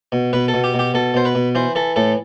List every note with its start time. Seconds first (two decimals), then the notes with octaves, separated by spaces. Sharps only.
0.12 B2
0.33 B2 B4
0.48 A4
0.54 B2
0.64 G4
0.74 B2
0.79 G4
0.94 B2 A4
1.14 B2 C5
1.25 B4
1.35 B2
1.55 E3 C5
1.75 E3 A4
1.96 A2 A4